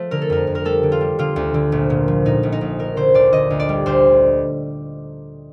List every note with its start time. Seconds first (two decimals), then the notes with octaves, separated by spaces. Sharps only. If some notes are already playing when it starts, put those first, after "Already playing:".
Already playing: F3 A3
0.11 D3 A#4
0.21 A4
0.30 F2 A#4
0.47 F2
0.55 A#4
0.65 G3 A4
0.83 D3
0.92 F4
1.01 G3
1.19 D3 F4
1.36 D2
1.54 D3
1.72 A#1
1.90 A#2
2.08 F3
2.25 A#2 D#4
2.43 A#1
2.52 D#4
2.61 A#1
2.79 D3 A#4
2.96 D3 C5
3.14 D2 D5
3.33 D3 D#5
3.50 D2
3.60 D5
3.69 G3
3.86 D2 C5